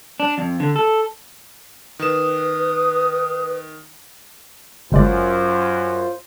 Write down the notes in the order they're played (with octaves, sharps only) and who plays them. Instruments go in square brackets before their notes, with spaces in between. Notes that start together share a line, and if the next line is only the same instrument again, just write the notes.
[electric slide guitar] D4
F2
D3
A4
[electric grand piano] D#3 E7 [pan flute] B4 [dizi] D#6
[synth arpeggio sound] G1 G#3 D5 [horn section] F#2 [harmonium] F4 C5